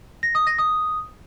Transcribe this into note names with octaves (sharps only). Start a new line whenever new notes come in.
A#6
D#6
A#6
D#6